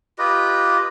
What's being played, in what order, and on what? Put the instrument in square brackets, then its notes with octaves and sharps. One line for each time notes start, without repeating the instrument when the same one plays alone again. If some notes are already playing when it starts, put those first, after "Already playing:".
[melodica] F4 G4 B4 D#5